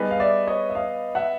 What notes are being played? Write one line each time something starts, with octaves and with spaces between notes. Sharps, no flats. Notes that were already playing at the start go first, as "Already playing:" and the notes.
Already playing: G3 B3 D#4 G#4 B4
F5
D5 E5
C#5 D#5
E5
D#5 F5
E5 F#5